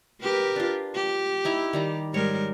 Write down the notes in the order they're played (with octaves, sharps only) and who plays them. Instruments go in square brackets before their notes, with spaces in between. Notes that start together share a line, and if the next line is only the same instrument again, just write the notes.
[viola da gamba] G4 A#4 B4
[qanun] D4 F4
[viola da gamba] G4
[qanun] D#4 E4 A#5
D#3 G3 A#5
[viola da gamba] G#2 G3 A#4 [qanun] C#5